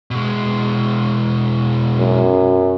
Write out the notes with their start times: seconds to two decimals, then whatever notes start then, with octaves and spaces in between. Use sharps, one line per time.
0.11 B2 G#3
1.97 F#2